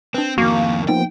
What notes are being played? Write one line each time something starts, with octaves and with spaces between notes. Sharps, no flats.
C4 D4 B4
F2 D#3 A#3 F#4 C#6
F3 A#3 B3 D#4 G5